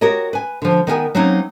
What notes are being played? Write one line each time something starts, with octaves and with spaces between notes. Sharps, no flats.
F#4 G4 A#4 C#5 D#5
B4 G#5
D3 F3
D#3 B3 A#4 G#5
F#3 A#3 C4 C#4 D#4